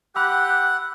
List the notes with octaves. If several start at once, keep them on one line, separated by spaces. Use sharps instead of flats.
G4 F#5 B5 E6 F#6